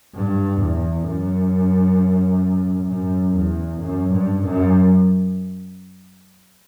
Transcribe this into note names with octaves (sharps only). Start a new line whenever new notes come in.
G2
E2
F#2
F#2
E2
F#2
G2
F#2